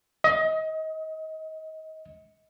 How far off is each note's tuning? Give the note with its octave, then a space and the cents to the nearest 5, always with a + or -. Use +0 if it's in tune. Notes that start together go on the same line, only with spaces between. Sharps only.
D#5 +25